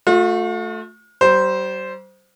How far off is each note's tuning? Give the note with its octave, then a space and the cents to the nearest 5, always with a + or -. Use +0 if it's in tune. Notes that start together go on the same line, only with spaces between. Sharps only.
A3 +0 F4 +45
G3 -40 C5 -5